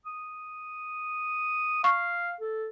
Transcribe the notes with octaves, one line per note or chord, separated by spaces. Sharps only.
D#6
F5 C#6
A4